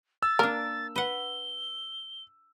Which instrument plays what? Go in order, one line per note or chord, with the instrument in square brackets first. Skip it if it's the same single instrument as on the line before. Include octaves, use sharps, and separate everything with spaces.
[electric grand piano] E6 [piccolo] A6
[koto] A#3 D4 [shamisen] A#4
[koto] B4 F#5 [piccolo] G7